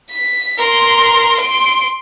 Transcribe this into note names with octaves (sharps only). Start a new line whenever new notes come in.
B6
A#4 C6
C6 D7